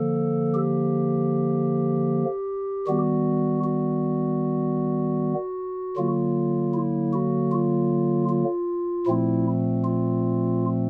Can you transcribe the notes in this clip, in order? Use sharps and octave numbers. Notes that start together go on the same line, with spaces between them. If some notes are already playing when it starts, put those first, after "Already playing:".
Already playing: D3 F3 A#3 A4
G4
D#3 G3 B3 F#4
F#4
D3 F#3 A#3 F4
E4
F#4
F4
F4
A#2 F3 A3 C4 E4
F4